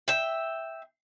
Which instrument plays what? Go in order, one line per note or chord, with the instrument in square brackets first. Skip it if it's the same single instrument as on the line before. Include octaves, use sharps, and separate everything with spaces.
[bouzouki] E5 G5